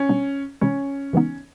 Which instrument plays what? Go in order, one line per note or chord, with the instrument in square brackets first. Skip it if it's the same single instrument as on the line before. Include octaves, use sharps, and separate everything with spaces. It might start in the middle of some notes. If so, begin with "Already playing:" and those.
Already playing: [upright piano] C#4
[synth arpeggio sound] B2 G3 B3 D4
[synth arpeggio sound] C3 E3 G#3 [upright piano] C#4
[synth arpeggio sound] C#3 E3 G#3 B3 D#4